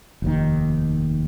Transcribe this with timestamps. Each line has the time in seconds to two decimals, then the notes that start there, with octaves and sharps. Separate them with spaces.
0.22 F1 D#2 D#3